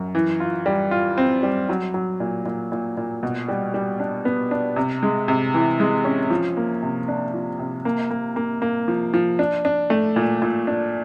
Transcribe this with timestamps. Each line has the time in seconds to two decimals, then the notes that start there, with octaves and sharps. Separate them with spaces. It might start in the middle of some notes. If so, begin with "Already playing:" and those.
Already playing: F#2
0.15 E3
0.40 F4
0.66 G3
0.91 F4
1.18 C4
1.43 G3
1.69 F#3
1.94 F#3
2.20 A#2
2.46 A#2
2.72 A#2
2.97 A#2
3.23 B2
3.48 G3
3.74 G3
4.00 D4
4.25 B3
4.51 D4
4.76 C3
5.03 G#3
5.28 C3
5.54 E3
5.80 G#3
6.05 C#4
6.30 F3
6.57 A#3
6.83 C3
7.08 D4
7.33 F3
7.59 C3
7.85 A#3
8.11 A#3
8.36 A#3
8.62 A#3
8.88 F3
9.14 F3
9.39 D4
9.65 D4
9.90 A3
10.16 A#2
10.42 A#2
10.67 D4